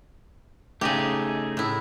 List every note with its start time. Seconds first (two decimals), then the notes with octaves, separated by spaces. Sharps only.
0.81 C#3 A3 D#4 G4 G#4
1.57 A2 E4